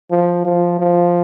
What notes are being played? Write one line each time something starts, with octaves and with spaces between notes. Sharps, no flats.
F3
F3
F3